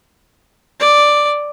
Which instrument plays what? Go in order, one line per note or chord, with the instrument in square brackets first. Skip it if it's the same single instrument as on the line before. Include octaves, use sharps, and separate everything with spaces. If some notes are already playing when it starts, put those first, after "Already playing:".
[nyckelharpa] D5